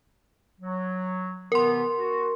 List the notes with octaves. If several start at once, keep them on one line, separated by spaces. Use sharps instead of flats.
F#3
C3 E3 B3 A#4 C6
F#4